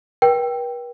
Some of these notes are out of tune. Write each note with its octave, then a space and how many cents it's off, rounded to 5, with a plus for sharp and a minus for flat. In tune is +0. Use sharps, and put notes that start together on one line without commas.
B4 -45 G5 +0